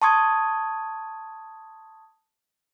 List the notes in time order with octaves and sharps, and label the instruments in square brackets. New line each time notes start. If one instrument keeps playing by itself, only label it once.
[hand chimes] A5 C6 C#6 D#6 G#6